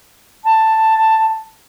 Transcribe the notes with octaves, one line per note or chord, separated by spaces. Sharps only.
A5